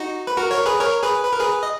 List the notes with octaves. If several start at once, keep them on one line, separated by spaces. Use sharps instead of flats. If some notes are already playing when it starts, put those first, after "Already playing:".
Already playing: D#4 F#4
B4
F#4 A#4
A#4 C#5
G#4 B4
A#4 C#5
G#4 B4
B4
A#4
G#4 B4
D#5